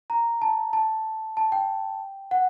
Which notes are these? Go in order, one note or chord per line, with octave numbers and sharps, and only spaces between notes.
A#5
A5
A5
A5
G5
F#5